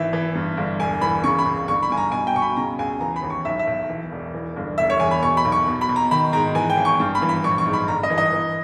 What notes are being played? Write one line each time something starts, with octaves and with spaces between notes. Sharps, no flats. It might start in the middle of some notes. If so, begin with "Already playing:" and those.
Already playing: G#1 E3 E5
E3
G2
G1
E1 G#5
E3 B5
C#3 C#6
B5
C#2
G1 C#6
B5
G2 G#5
A#5
B2 G#5
G5
B2 C#6
B5
C#3 A#5
C#2 G#5
E3 A#5
B5
D#2
C#6
B1 E5
E5
B1
E3
E1
E3
G1
E1 E5
C#5
E2 G#5
B5
B2 C#6
B5
B1
C#6
B2
B5
B2
A#5
D#3 B5
G#2 A#5
E3 G#5
G5
G#1
C#6
G2
B5
E3
B5
A#1 C#6
C#6
G#2
B5
G1 A#5
D#5
E3
D#5
E3